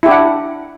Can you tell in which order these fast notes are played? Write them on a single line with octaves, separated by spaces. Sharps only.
E4 G4 D4 F#5